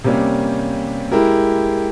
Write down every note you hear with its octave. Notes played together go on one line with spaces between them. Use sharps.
C3 G3 A#3 C#4 G4
G#3 E4 G4 A#4